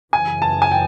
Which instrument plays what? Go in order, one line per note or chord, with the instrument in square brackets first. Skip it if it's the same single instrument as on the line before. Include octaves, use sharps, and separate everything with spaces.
[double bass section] F#2 C#3 E3 [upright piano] G#5
[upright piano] A5
G#5
G5